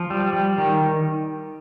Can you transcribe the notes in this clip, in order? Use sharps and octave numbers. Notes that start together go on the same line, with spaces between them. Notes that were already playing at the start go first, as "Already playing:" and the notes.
Already playing: F3
G3
G3
D#3